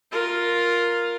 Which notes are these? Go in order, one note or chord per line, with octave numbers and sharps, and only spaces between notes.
F4 A#4